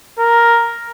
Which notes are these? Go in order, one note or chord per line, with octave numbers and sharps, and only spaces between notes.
A#4